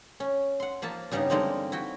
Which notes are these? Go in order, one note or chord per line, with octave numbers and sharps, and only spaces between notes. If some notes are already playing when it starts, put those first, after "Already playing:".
C#4
F#5 C6
F3 A#3 E5 A5
G2 C#3 G3 B3 D#4
D3 G3 G#3 A#3 C4 D#4
E4 F#4 G5